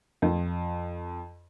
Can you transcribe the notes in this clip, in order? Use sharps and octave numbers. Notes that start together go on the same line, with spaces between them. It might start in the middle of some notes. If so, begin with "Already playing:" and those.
F2